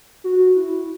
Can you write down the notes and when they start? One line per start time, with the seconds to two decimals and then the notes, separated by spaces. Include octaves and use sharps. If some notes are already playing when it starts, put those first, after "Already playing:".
0.24 F#4
0.56 E4